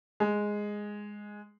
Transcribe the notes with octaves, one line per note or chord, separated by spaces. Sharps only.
G#3